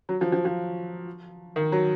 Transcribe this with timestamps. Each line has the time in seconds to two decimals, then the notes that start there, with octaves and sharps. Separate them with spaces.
0.09 F#3
0.21 F3
0.32 F3
0.45 F3
1.56 D#3
1.72 F#3